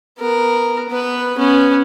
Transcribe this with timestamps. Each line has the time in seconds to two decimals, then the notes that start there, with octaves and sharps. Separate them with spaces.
0.19 B3 A#4
0.89 B3 B4
1.38 B3 C#4